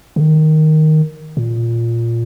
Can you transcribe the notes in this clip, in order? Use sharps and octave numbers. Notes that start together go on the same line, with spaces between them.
C#3
D#3
A#2